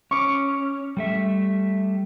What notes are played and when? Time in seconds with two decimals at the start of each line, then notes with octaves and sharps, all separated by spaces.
0.11 C#4 C#6 D6
0.97 G3 A3 E5